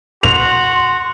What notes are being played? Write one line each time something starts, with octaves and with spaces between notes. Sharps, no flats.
F#4 C6 F7